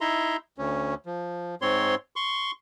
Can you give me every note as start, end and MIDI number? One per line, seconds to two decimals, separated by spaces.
0.01 0.37 63
0.01 0.37 64
0.01 0.37 76
0.01 0.37 82
0.01 0.37 84
0.58 0.95 38
0.58 0.95 61
1.06 1.55 53
1.62 1.95 44
1.62 1.95 60
1.62 1.95 73
1.62 1.95 84
2.16 2.51 84
2.16 2.51 85